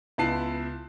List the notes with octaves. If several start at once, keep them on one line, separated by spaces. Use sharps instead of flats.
C#2 B3 E4 A5 F#6 C7